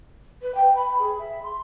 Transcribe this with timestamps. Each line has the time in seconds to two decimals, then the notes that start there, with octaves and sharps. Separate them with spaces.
0.42 B4
0.54 G5
0.75 B5
0.99 G#4
1.19 E5
1.43 C6